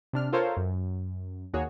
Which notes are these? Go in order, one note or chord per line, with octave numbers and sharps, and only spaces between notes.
C3 D4 F6
F4 A4 A#4 C5 C#5 F5
F#2
D#2 A#3 F#4 G#4 C#5